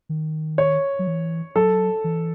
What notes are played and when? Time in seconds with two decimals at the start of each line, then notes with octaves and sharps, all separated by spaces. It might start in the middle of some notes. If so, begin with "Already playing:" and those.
0.09 D#3
0.58 C#5
0.99 F#3
1.07 E3
1.56 F#3 A4
2.04 E3